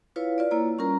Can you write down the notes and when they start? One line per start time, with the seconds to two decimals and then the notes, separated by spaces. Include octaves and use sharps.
0.16 E4 F4 B4 C#5 F5
0.38 F4 B4 D5
0.51 A#3 E4 C#5 A#5
0.78 G3 C#4 F4 A#4 A#5